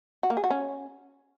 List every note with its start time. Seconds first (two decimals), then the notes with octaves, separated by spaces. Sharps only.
0.23 F#4
0.30 A#3
0.37 G#4
0.44 F#4
0.50 C#4